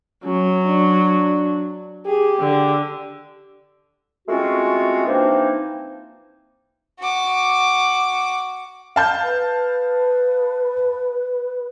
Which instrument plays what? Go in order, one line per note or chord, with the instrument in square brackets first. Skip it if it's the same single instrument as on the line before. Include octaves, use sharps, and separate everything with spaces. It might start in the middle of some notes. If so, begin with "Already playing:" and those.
[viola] F#3 [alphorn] C#4
[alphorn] D4
[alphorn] G4 [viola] G#4
[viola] D3
[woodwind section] G#3 A3 C4 C#4 F4 F#4
E3 F3 A#3 C4 D4 D#4
[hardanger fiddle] F#4 D6
[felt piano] F5 A5 G6
[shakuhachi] B4